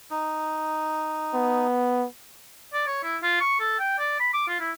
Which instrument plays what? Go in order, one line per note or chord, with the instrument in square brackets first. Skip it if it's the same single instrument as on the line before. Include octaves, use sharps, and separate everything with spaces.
[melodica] D#4
[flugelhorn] B3
[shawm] D5
C#5
E4
F4
C#6
A4
G5
D5
B5
D6
F4
E4